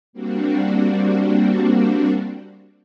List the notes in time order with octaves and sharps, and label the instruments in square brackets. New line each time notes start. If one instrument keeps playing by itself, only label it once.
[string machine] G3 A#3 C4 D4 F#4